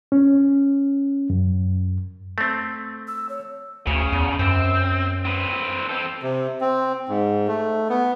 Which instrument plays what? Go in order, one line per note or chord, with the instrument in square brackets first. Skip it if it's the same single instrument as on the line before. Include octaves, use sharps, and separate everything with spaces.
[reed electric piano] C#4
F#2
[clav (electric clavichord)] A3 C4
[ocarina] E6
C#5
[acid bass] D2 [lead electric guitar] C#3
[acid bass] E2
[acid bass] F#2 [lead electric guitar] C4
[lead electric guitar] C4 B4
C4 A4
[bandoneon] C3
C4
G#2
A3
B3